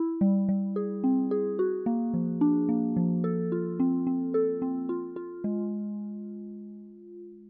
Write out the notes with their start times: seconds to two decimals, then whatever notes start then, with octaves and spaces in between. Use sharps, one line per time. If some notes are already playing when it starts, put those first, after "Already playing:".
Already playing: E4
0.21 G3
0.49 G3
0.76 G#4
1.04 C4
1.31 G#4
1.59 F#4
1.86 A#3
2.14 F3
2.41 D4
2.69 A#3
2.97 F3
3.24 A4
3.52 F4
3.80 C4
4.07 C4
4.34 A4
4.62 C4
4.89 F4
5.16 F4
5.44 G#3